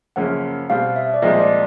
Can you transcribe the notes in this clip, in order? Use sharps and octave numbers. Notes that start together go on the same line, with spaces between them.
F#2 C#3 F3 A#3 C#4 F#5
B2 G3 C4 F5
E5
D5
C2 A#2 F3 G#3 C4 D#5
D5